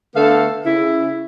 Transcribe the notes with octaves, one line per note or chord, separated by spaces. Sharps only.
D3 A3 B3 A4 F5
C#3 E4